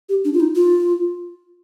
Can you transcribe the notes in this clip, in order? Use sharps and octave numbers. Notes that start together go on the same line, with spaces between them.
G4
D4
F4
D#4
F4